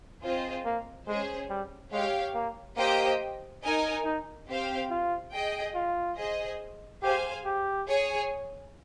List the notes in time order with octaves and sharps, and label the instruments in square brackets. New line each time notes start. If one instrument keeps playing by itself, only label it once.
[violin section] C4 F4 G#4 C5 D#5
[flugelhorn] A#3
[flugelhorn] G#3 [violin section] C#4 G#4 C5
[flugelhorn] G3
[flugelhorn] G#3 [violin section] G4 C#5 F5
[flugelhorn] A#3
[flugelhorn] A#3 [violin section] G4 C5 D#5 G5
[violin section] D#4 A#4 D#5 G#5
[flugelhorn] D#4
[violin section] C4 G4 C5 F5
[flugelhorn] F4
[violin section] G#4 D#5 G5
[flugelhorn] F4
[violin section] G#4 C5 D#5
[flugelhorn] G4 [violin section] G#4 C5 F5 G#5
[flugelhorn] G4
[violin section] G#4 C#5 G#5